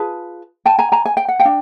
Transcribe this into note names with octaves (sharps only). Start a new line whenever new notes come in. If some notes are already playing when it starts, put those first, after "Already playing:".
Already playing: F4 G#4 B4 A5
G5 A5
G#5 A#5
G#5 A#5
G#5
G5
F#5
F5 G5
D4